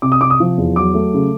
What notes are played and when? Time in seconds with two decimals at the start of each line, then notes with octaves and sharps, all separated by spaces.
0.02 C3 D6
0.12 D#6
0.21 C3 D6
0.30 D#6
0.40 F3
0.58 E2
0.76 F#3 D6
0.94 A3
1.14 C#3